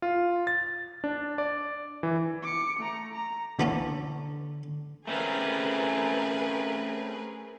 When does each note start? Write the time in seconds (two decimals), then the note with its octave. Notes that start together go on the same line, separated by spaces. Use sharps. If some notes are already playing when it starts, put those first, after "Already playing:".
0.02 F4
0.47 A6
1.04 D4
1.38 D5
2.03 E3
2.42 D6 C#7
2.79 A3 A#5
3.14 A#5
3.59 D3 E3 B3 C#4
5.07 A3 C4 C#4 G#4 A#4 B4